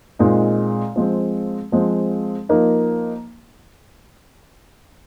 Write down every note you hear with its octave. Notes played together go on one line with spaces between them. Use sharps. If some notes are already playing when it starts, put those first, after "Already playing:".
A#2 G#3 C4 D#4
F3 G#3 C4
F3 G#3 C4
F3 A#3 D#4